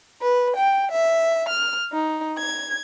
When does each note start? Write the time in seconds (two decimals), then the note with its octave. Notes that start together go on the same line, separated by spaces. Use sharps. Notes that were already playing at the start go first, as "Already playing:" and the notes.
0.22 B4
0.56 G5
0.91 E5
1.49 F6
1.93 D#4
2.39 G#6